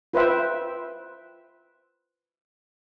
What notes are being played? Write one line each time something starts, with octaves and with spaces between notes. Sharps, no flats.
F4 B4 C5 E5 G5